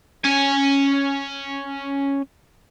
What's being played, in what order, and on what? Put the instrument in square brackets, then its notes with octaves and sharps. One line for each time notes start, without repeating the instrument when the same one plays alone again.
[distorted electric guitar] C#4 G#5